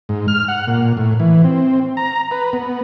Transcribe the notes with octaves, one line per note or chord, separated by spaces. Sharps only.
G#2
F6
F#5
A#2
A2
E3
C4
A#5
B4
B3